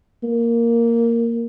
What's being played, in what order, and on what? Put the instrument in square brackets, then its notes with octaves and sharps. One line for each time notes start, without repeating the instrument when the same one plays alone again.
[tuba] A#3